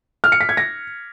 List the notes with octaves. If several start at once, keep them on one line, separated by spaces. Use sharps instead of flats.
F6
C#7
B6
G#6
A#6